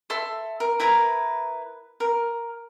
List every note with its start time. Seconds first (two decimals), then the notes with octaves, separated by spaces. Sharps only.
0.10 A4 E5 C6
0.60 A#4
0.80 E4 A#4 B4 A#5
2.00 A#4